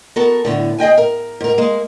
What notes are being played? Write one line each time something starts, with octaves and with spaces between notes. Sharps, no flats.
B3 F#4 A4 A#4
A2 D3 B3
G#4 D#5 G5 G#5
A#4
G#2 A#4
G#3 A#3